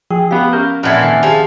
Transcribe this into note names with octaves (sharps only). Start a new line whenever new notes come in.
F3 G#4 G5
B3 G4 F5
C#4 A#4 F5 G6
F2 A#2 E3 A4 F#5 G#6
D#3 C7
F3 G4 G#4